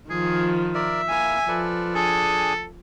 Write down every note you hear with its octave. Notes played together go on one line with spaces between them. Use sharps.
D#3 F3 G#4
A#4 D5 E5
A#3 E4 F5 G#5
F3 A4 B4 D5
D4 G#4 A4 G#5